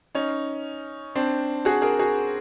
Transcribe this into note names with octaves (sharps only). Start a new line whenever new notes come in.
C#4 D#4
C4 D4
F#4 G#4
G#4 A#4
F#4 G#4